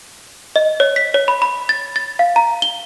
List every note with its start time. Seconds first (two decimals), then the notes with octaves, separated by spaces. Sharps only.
0.56 D#5
0.80 C#5
0.96 B6
1.14 C#5
1.28 B5
1.42 B5
1.69 A6
1.96 A6
2.19 F5
2.36 A#5
2.62 G7